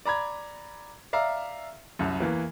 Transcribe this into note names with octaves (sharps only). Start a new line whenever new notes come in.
D5 A#5 B5 G#6
D5 E5 F5 A#5
C2 F#2
E2 E3 A#3